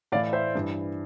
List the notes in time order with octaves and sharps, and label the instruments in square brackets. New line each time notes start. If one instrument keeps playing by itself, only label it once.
[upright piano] A2 D5 F5
E3
C5 E5
G2 E3